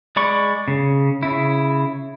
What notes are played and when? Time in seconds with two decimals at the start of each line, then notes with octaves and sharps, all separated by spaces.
0.16 G#3 D5 B5 C#6
0.68 C#3
1.23 C#3 E4